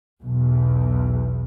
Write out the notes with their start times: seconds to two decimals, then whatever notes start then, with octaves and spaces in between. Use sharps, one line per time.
0.20 B1 E2